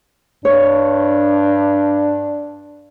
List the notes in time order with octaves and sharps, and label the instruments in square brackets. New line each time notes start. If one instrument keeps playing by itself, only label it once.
[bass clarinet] G2 [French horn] D4 [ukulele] C#5